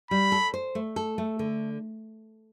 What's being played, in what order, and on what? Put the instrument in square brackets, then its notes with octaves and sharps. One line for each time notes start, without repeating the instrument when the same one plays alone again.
[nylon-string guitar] G3 [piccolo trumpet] B5
[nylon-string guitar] A4
C5
A3
A4
A3
D3